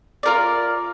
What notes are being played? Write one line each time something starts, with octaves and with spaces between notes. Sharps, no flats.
F4 A#4 D5